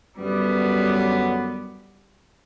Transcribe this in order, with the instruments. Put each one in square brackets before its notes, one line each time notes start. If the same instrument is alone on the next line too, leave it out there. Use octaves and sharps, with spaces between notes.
[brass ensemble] F#2 D3 F#3 B3 [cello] G3